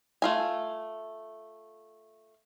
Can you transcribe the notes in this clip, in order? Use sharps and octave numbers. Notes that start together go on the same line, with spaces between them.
A3 F4 G#5